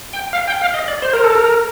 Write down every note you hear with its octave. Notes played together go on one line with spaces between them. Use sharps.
G5
F5
G5
F5
D#5
D5
C5
A#4
A4
A#4